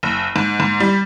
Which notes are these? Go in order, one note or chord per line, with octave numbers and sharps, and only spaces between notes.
F#1
G#2
G#2
G3